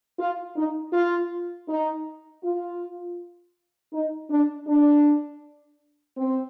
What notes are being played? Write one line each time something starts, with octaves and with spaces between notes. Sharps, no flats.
F4
D#4
F4
D#4
F4
D#4
D4
D4
C4